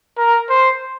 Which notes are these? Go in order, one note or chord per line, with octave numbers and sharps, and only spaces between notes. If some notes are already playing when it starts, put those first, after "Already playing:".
A#4
C5